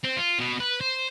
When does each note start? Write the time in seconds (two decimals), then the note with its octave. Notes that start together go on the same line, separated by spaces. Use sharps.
0.04 C4
0.17 F4
0.39 B2
0.60 B4
0.81 C5